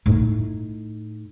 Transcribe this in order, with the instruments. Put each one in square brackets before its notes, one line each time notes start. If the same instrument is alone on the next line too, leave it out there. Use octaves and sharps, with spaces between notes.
[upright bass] A2 D#4